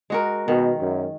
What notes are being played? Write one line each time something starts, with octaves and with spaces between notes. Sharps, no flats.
G#3 F#4 A#4
B2 D#3
F#2